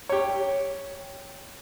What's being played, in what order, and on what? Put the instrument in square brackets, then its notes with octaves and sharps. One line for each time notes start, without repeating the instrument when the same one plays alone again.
[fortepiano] G4 C#5